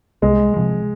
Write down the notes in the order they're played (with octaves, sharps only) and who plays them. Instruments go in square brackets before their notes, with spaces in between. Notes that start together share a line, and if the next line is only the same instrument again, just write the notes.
[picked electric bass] C2 [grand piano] G#3
[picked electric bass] C3 F3 G#3